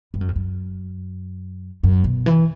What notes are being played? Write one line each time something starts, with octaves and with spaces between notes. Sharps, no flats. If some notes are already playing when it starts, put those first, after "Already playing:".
G2
F#2
F2
F#2
F#2
B2
E3